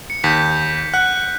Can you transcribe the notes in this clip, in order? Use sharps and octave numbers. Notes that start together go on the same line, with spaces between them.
C#7
D#2 G6 B6
F#5 F#6